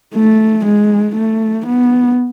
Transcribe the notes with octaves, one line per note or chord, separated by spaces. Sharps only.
A3
G#3
A3
B3